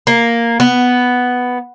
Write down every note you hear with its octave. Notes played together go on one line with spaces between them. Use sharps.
A#3
B3